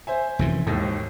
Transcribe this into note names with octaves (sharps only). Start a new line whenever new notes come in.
C5 E5 G#5
F1 F#2 E3
E1 D#2 G#2